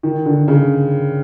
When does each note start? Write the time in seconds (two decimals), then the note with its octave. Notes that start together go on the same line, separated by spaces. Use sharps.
0.03 D#3
0.26 D3
0.48 C#3